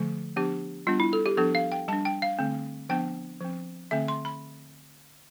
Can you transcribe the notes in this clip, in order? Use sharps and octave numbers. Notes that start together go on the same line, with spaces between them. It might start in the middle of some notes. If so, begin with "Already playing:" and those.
Already playing: D3 F3 A3
F3 B3 D4 G4
G3 B3 D4 F4
E4
A4
G4
F3 B3 D4 A4
F5
G5
G3 D4 A5
G5
F5
D3 A3 C4
F3 B3 D4 G5
F3 C4
D3 A3 C4 E5
C6
B5